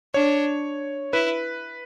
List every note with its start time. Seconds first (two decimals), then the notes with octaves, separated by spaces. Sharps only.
0.14 D4 C#5
1.13 E4 B4